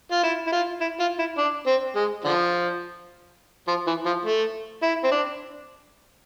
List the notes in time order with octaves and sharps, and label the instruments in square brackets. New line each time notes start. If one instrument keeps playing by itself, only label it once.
[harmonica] F4
E4
E4
F4
E4
F4
E4
D4
C4
G#3
D3 F3
F3
E3
F3
A3
E4
C4
D4